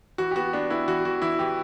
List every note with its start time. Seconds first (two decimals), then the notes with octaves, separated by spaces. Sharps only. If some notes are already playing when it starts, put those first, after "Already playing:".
0.18 E3 F#4
0.31 G4
0.36 B3 F#4
0.53 B3 D4
0.70 B3 E4
0.88 E3 F#4
1.05 E3 F#4
1.22 E3 E4
1.39 E3 G4